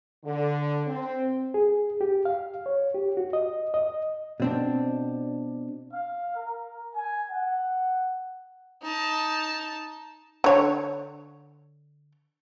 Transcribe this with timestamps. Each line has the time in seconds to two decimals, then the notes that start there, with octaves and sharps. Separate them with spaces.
0.25 D3
0.87 C4
1.54 G#4
2.01 G4
2.25 F5
2.66 C#5
2.94 G4
3.17 F#4
3.33 D#5
3.74 D#5
4.40 B2 C4 D4
5.92 F5
6.36 A#4
6.93 G#5
7.27 F#5
8.83 D#4 A5
10.44 D3 C#5